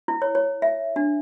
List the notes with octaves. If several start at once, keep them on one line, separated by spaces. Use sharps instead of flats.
E4
C#5
C#5
E5
D4